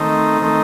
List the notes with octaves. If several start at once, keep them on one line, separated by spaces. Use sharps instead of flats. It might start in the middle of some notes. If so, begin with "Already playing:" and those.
Already playing: D#3 A3 C4 D#4
D#3 A3 C4 D#4